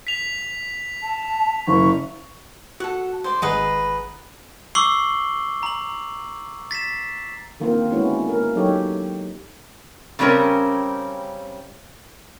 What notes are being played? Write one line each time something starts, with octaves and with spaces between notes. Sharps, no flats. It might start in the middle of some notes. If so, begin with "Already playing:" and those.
B6 F7
A5
F#1 C#6
F#4 A4 F#5
C5 D5
G#1 G#4 B4 D#5 F#5 A#5
C#6 D6 E6 C7 F#7 G7
A#5 F#7
A6 B6 C7 E7
D3 D#3 A#3 C4 F4 C5
D3 G#3 B3 C#4 E4 F#4
A#3 A#4
F#3 D#4 G4 A4 C#5
C#3 G3 C4 C#4 A#4